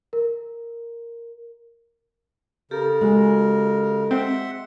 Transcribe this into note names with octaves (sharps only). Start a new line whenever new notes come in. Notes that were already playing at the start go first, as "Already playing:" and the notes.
A#4
C#3 G4 A4 A#4
G#3 F#4 G#4
C4 E5 F#5 C6